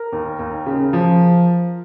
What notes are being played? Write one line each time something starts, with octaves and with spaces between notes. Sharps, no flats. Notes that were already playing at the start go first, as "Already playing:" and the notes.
Already playing: A#4
D#2
D#2
C#3
F3